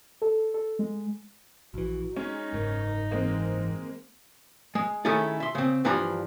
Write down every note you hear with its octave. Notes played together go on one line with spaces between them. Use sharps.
A4
A4
G#3
A#1 E3 F#4
G#3 C#4 D#4
F#1 G#2 A#4
E3 G#3 A#3 C4
G#3
D#3 A3 C#4 E4 G#4 A4
E5 C6
C#3 C4
G2 E3 F3 D4 A#5